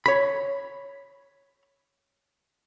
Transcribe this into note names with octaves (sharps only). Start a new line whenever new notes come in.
C#5 B5